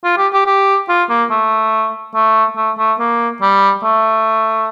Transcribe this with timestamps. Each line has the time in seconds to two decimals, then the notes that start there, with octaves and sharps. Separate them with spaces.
0.04 F4
0.18 G4
0.33 G4
0.46 G4
0.89 F4
1.09 A#3
1.31 A3
2.15 A3
2.56 A3
2.78 A3
2.99 A#3
3.42 G3
3.83 A3